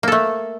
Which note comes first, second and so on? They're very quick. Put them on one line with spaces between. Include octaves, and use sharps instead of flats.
A#3 A4 A3